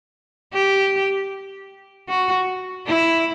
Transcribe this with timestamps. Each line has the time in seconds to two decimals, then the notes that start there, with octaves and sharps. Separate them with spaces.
0.53 G4
2.09 F#4
2.87 E4